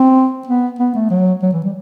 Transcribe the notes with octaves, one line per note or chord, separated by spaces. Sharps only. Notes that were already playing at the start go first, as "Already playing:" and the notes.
Already playing: C4
B3
B3
A3
F#3
F#3
E3
G3